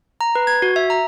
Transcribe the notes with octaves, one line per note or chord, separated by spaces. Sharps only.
A#5
B4
G#6
F#4
E5
A#5